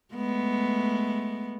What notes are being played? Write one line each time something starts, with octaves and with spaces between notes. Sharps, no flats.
G#3 A3 B3